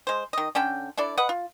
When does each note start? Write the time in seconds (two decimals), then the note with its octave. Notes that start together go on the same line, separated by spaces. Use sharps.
0.07 G#3 C5
0.33 D#3 D#5
0.55 D3 C#4 A4 G5
0.97 D4 E4 A4 D5
1.17 B4 D#5 F#5
1.29 F4